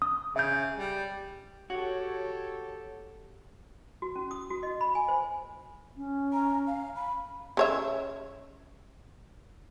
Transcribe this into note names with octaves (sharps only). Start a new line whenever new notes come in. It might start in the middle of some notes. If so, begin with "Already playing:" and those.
D#6
C#3 E5 G6
G3
F#4 G4 A4 C#5
F#4
C#4
D#6
F#4
D#5
B5
G#5
C5
C#4
A#5
F5
B5
C#3 C#5 E5